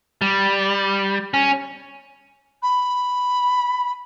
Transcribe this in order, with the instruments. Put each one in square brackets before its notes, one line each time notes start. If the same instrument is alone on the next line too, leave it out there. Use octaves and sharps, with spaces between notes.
[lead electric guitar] G3
C#4
[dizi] B5